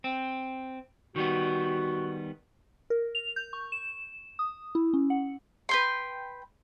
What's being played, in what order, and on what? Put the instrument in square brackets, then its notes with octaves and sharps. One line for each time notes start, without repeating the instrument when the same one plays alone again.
[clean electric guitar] C4
[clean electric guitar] D#3 G3 B3 [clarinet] F#4
[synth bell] A#4
F7
G6
C#6
E7
D#6
E4
C#4
F#5
[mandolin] B4 G5 C6